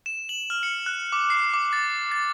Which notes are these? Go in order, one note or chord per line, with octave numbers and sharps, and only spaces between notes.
E7
F#7
F6
C#7
F#6
D6
C7
D6
A6
A6